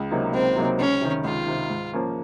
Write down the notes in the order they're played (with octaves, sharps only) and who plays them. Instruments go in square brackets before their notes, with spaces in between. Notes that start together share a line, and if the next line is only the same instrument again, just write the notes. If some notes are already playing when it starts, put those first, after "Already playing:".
Already playing: [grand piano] C#2
C3 F#3 A#3 D#4
[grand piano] C#2 [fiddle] C4
[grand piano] C3 F#3 A#3 D#4
[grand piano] C#2 [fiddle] C#4
[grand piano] C3 D#3
[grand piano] C#2 [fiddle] F4
[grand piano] C3 D#3
G#2
F3 A#3 C#4